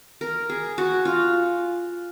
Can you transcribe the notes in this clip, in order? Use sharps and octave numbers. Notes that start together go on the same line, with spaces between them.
A#4
G#4
F#4
F4